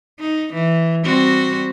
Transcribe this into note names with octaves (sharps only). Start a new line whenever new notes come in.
D#4
E3
G3 C4 F#4